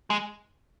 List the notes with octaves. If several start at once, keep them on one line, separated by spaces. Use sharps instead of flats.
G#3